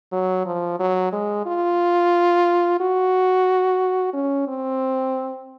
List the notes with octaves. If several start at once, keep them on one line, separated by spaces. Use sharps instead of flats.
F#3
F3
F#3
G#3
F4
F#4
C#4
C4